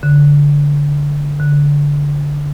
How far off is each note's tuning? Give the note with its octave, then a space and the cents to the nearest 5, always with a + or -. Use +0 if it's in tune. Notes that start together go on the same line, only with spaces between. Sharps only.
D3 -20
D3 -20